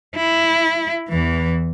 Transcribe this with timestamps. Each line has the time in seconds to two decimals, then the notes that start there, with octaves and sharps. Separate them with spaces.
0.16 E4
1.08 E2 E3